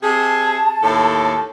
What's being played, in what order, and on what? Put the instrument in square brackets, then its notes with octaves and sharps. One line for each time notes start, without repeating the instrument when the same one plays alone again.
[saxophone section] C3 G#4 [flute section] A5
[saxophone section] D#2 A2 A4